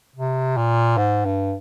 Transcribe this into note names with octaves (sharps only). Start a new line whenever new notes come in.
C3
A#2
G#2
G2